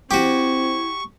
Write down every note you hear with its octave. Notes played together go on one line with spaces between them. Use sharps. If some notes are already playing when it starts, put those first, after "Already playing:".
C4 E4 F#4 G4 C#6